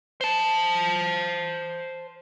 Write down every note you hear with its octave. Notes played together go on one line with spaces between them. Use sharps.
C5 A5